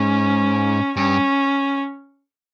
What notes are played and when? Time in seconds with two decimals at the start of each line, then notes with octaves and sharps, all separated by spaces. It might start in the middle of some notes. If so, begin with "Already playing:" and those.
Already playing: G#2 C#4
0.96 G2 C#4